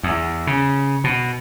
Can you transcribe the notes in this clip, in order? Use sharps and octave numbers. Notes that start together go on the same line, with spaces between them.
E2
C#3
B2